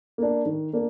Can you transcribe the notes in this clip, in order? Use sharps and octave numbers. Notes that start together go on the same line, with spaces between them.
A#3 D4
D#3
A#3 D4